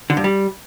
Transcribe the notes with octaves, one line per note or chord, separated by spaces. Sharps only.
D3
G2
G3